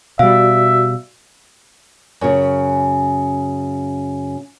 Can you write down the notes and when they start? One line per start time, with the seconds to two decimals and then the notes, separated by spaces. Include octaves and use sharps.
0.19 B2 G3 F#4 D5 E5 F5
2.21 F#2 C#3